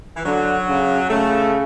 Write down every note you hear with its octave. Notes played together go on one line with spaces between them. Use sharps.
E3
D3 F#3
C#3
C#3 A3